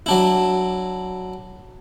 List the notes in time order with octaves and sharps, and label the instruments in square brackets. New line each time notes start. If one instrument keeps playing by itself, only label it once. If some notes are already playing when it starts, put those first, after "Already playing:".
[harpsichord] F#3 D4 E4